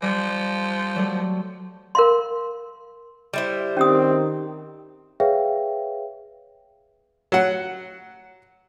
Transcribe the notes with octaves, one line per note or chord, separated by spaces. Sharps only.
F3 G3
F#3 G3 A3
A#4 F5 C6
G3 E4 C5
D#3 C4 C#4 G4 D#6
G#4 B4 C#5 E5 F5 G5
F#3 F#5